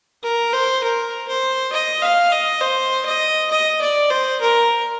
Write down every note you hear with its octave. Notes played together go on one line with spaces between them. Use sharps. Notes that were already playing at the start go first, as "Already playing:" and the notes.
A#4
C5
A#4
C5
D#5
F5
D#5
C5
D#5
D#5
D5
C5
A#4